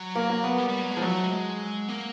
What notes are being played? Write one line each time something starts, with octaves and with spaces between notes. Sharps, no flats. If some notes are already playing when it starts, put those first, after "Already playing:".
Already playing: F#3
A#3
A#3
B3
G3
G3
F#3
G#3
F3
F#3 A3
G#3
A#3